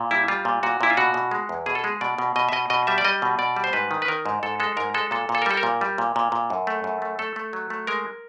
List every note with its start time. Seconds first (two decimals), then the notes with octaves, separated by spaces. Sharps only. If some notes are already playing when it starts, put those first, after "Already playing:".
Already playing: A#2
0.11 G3 E4
0.28 G3 F4
0.45 A#2
0.63 A#2 F#4
0.81 A#2 E4
0.90 F4
0.97 B2 F#4
1.14 B2
1.31 G#3
1.49 E2
1.66 B2 G#4
1.75 A4
1.84 G#3 G#4
2.01 B2 D5
2.18 B2
2.36 B2 D#5
2.49 E5
2.52 B2 D#5
2.70 B2 D#5
2.87 G3 E5
2.98 D5
3.05 G3 D#5
3.22 B2
3.39 B2 D5
3.56 G3
3.64 C5
3.73 G#2 B4
3.91 D#3
4.02 B4
4.08 D#3 A#4
4.26 G#2
4.43 G#2 A4
4.60 G#3 A4
4.77 G#2 A#4
4.94 G#3 A4
5.11 A#2 A4
5.29 A#2
5.35 A4
5.42 A#4
5.46 G3 A4
5.57 A#4
5.63 A#2
5.81 G3
5.98 A#2
6.16 A#2
6.32 A#2
6.50 F#2
6.67 A3
6.84 F#2
7.02 A3
7.19 A3 A4
7.36 A3
7.53 F#3
7.70 A3
7.87 G#3 A#4